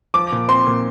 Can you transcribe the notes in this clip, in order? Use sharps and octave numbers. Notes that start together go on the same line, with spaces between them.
F3 D6
A#2
C4 C6
A#2